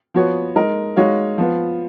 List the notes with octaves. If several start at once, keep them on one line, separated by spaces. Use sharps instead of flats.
F3 B3 F#4 C#5
G#3 D#4 A#4 D#5
G#3 D#4 F#4 C#5 F5
F3 B3 F4